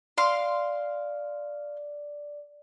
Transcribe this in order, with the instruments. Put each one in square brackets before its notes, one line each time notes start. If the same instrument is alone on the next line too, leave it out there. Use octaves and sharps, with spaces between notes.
[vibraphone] D5 [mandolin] F5 C6